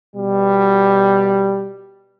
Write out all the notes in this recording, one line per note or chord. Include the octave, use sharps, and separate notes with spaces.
B2 G3